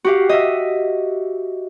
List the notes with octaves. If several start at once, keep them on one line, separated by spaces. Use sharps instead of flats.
F#4 G4 F5
D#5 E5